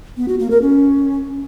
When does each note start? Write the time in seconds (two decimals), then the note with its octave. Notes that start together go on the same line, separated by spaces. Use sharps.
0.17 B3
0.28 F#4
0.39 A#3
0.51 A#4
0.62 C#4